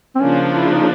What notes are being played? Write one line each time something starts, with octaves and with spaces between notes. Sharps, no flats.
C4
C#3 F3 A#3 C#4 D4
E4
D#4